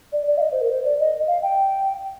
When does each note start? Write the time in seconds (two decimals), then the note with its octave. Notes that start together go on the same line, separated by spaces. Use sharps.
0.13 D5
0.27 D5
0.38 F5
0.41 D#5
0.52 C5
0.61 A#4
0.70 C5
0.84 D5
1.00 D#5
1.27 F5
1.43 G5